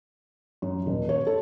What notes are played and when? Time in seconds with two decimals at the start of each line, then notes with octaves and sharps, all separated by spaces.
0.62 F#2
0.86 D#1
1.09 C#5
1.27 A4